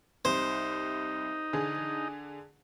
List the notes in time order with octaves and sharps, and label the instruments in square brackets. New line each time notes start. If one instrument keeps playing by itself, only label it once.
[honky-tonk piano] C2 [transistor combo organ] D#4 [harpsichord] C5
[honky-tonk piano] D3 G#4